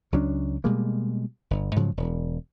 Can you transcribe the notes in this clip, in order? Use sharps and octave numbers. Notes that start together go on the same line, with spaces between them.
C#2 F#3 C#4 D4
B2 G3 G#3 A#3
G1
G#2 C#3 F3 F#3
E1